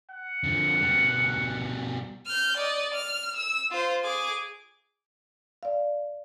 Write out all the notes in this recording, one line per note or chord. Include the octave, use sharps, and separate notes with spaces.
F#5
D3 F3
B2 G3
F6 G6
D5 D#5
F6
E6
F4 C5
G#4 D6
D5 F5